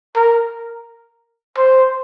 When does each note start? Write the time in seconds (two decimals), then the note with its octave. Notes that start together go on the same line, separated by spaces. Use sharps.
0.16 A#4
1.57 C5